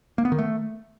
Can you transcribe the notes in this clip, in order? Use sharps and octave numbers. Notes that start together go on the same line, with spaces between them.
A#3
B3
D#3
A3